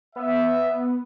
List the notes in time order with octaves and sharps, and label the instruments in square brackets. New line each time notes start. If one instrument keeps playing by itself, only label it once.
[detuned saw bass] B3 [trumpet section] E5